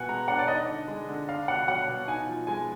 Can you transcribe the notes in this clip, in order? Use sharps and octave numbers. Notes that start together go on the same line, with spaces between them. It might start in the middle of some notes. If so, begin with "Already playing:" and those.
Already playing: B2 B3 F#5 G#5
G#3 A#5
D4 F#5
D5
D#4 D#5
D3
G#3
D3
D4 F5
B2 F#5
F#3 F#5
B2
D#4 G#5
F3
G#3 G#5